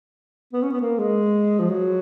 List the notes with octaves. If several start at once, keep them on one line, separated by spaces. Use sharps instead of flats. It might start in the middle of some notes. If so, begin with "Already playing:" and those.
B3
C#4
B3
A#3
G#3
F3
F#3